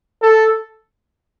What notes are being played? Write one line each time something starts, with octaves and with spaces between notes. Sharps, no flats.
A4